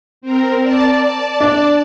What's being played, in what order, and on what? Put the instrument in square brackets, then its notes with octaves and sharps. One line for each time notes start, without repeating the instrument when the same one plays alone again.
[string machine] C4 A#4
D5 A5
[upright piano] D4